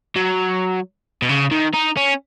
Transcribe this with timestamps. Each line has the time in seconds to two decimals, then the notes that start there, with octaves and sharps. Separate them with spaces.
0.16 F#3
1.22 B2
1.29 C#3
1.51 D#3
1.74 D#4
1.97 C#4